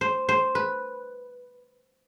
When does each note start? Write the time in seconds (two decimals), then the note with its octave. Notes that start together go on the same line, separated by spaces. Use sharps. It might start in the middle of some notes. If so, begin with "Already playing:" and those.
0.01 C5
0.29 C5
0.55 B4